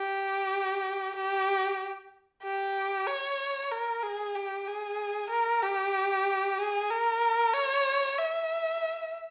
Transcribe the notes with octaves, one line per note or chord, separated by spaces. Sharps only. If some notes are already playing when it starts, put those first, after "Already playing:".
Already playing: G4
G4
G4
C#5
A#4
G#4
G4
G#4
A#4
G4
G#4
A#4
C#5
E5